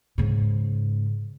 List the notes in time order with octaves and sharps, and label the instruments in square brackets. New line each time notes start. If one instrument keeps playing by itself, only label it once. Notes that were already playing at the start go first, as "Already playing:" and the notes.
[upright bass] G#2 C#3